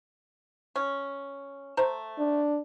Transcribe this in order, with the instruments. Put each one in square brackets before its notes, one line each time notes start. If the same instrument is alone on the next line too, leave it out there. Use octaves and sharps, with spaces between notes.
[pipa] C#4
A3 C5 A#5
[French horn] D4